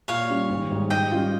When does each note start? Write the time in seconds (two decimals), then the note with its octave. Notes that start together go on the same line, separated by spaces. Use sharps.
0.08 A#2 C#5 F5
0.29 G3 C#4
0.49 G#1
0.70 G#2 G3
0.90 G#2 D#5 G5
1.11 G3 C#4 F4